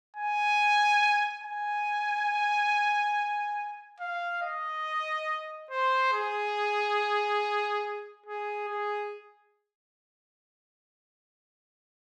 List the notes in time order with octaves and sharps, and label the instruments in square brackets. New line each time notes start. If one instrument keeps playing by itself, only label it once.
[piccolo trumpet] G#5
G#5
F5
D#5
C5
G#4
G#4
G#4